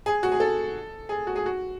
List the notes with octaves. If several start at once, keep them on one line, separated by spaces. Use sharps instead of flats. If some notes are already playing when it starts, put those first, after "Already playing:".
G#4
F#4
G#4
A4
G#4
F#4
G#4
F#4